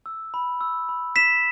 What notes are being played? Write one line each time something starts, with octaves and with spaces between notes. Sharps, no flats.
E6
B5
E6
B5
E6 B6 E7